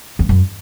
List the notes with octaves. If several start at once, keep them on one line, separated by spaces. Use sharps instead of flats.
E2
F#2